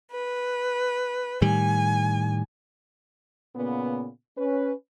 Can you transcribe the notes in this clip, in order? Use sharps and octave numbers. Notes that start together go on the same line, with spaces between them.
B4
A2 D#3 G3 G#5
A#2 C#3 B3
C#4 B4